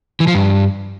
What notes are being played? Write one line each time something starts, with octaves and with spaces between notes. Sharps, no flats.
E3
F3
G2